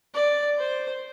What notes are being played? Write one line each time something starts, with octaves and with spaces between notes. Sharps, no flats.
D5
C5